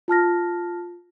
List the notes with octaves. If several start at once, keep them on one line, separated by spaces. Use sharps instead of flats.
F4 A5 F6 A#6